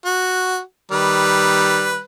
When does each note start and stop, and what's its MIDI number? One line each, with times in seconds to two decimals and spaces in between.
0.05 0.60 66
0.91 2.00 51
0.91 2.00 55
0.91 2.00 71